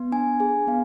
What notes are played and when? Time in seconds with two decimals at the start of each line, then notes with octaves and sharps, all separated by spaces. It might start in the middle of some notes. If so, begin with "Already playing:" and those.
Already playing: B3
0.12 D4 G#5
0.40 G#4 G#5
0.67 B3 F5